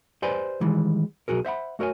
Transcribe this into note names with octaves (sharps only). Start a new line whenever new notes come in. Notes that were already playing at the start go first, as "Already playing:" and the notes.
G4 B4 C5 D5 G#5
D#3 E3 G3 G#3
B1 G2 F#4 G#4 A#4
C5 E5 F#5 B5
A3 F#4 A#4 C#5 G#5